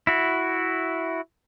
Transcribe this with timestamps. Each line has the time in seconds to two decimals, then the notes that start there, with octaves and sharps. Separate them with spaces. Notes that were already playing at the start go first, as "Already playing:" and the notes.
0.07 E4 F#4